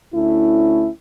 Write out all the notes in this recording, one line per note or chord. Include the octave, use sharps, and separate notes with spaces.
D2 A3 C#4 E4